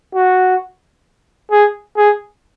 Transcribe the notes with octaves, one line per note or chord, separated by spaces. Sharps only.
F#4
G#4
G#4